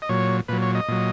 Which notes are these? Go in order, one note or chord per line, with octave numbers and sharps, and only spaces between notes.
D#5
A#2 F#3 C#5
A#2 F#3 B4
C#5
D#5
A#2 F#3